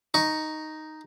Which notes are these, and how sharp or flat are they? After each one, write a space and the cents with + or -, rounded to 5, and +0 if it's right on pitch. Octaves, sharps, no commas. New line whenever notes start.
D#4 +0 C#6 +0